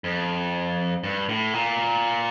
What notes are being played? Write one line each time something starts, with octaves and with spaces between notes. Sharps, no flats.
F2
G2
A2
A#2